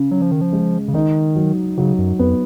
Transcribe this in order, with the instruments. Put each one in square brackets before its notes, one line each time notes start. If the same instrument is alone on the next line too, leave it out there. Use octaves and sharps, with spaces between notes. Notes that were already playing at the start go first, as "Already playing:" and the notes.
Already playing: [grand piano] C#3
[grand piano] C#3 [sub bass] F#3
[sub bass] F3
D#3
F3
[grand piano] G#3
[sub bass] C#3
[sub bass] D#3 [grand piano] D#4
[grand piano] F#3
[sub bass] C#3 [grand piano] F#3
[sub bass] F#2
[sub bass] F2 [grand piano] B3